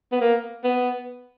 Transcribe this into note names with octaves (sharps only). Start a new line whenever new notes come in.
B3
A#3
B3